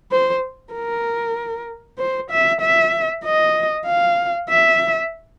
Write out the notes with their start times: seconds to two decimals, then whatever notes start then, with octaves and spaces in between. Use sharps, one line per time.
0.11 C5
0.74 A#4
1.98 C5
2.31 E5
2.61 E5
3.24 D#5
3.86 F5
4.49 E5